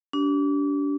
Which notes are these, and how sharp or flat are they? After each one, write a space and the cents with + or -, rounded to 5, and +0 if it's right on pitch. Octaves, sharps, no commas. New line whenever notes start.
D4 -35 G4 -30